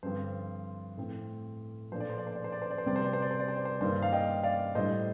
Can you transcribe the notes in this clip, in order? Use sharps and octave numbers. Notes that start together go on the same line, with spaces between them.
G2 D3 F3 C4 C5
A2 A3 C4
A#2 F3 A3 D4 C5
D5
C5
D5
C5
D5
C5
D5
C5
D5
C5
C3 G3 C4 D5
C5
D5
C5
D5
C5
D5
C5
D5
C5
G2 D#3 A#3 D4 C5
F5
D#5 G5
D5 F5
A2 G3 D4 C5 D#5